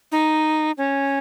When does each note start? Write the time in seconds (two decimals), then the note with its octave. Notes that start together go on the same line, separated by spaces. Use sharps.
0.12 D#4
0.78 C#4